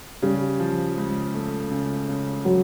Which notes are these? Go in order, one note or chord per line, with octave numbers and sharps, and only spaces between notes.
C#3 G3
F3
C#2
A3
C#3
C#3
F#3